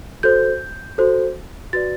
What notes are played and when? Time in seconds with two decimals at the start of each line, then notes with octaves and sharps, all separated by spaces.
0.23 F#4 A4 C5 G6
0.98 F#4 A4 C5
1.73 F#4 B4 D5 A6